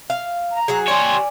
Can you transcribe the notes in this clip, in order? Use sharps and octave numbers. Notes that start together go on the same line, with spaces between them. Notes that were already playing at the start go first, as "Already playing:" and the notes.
F5
A#5
F#3 F#4 G#4
G4 C#5 D5 G#5 C6